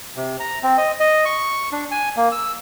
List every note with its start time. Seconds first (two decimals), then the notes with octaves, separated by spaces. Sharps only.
0.16 C3
0.40 A#5
0.63 C4
0.78 D#5
1.00 D#5
1.25 C#6
1.72 D4
1.91 G#5
2.16 A#3
2.32 E6